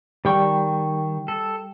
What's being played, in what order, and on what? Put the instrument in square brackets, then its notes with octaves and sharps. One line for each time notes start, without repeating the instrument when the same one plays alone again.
[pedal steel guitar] D#3 C#6 [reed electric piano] G3 G5
[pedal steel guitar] A4